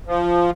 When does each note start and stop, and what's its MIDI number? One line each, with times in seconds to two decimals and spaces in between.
0.07 0.50 53